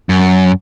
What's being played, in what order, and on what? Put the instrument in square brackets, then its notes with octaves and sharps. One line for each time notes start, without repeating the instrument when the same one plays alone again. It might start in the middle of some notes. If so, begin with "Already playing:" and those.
[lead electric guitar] F#2